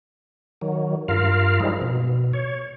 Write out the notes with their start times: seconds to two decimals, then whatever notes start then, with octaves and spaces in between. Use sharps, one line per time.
0.61 D#3 F#3
1.08 G2 F4 A#4 F5
1.60 F3 G3 G#3 D#4 E4
1.81 B2
2.33 C#5